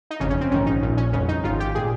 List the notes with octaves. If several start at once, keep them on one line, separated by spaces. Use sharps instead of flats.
D#4
G1 F2 C#3 C#4
C#4
C4
A#1 G#2 D#3 C#4
D#4
A#1 A#2
C#4
G1 F2 C#3 C#4
D#4
G#1 G#2 D#3 F4
G4
A#2 G#4